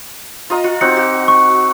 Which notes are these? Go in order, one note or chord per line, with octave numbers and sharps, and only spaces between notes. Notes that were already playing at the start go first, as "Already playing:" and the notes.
F4 D#5 A#5
F4
C4 D#4 F#4 C#7
F#4
C#6